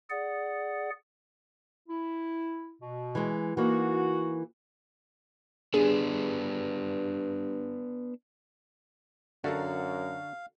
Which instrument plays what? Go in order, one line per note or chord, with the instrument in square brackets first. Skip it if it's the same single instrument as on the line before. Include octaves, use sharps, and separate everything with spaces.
[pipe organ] G#4 D5 F#5
[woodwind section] E4
B2
[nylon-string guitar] E3 G#3
[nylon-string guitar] E3 A#3 D#4 [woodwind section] F#4
[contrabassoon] G2 [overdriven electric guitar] B3 D4 [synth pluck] G#4
[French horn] F#2 [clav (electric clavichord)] D3 [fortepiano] F#4 A4 A#4 [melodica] F5